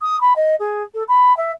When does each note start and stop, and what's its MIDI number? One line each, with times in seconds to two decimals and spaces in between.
0.01 0.20 87
0.21 0.33 83
0.36 0.55 75
0.60 0.83 68
0.94 1.03 69
1.08 1.35 83
1.37 1.52 76